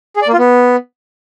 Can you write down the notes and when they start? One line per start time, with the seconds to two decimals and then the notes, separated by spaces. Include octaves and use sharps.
0.16 G#4
0.22 D5
0.27 A#3
0.33 F4
0.39 B3